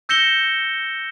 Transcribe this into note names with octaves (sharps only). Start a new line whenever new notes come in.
E6 G6 A#6 C#7 E7 G7